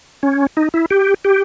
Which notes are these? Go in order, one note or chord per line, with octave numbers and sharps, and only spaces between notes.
C#4
D#4
E4
G4
G4